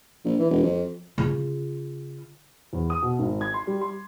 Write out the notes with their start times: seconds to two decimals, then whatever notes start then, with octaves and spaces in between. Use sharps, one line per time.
0.25 A#1
0.39 E3
0.51 E1
0.63 F2
1.18 C#3 F4
2.73 E2
2.90 D#6
3.02 B2
3.19 G#1
3.41 G#6
3.54 C6
3.67 G3
3.81 C6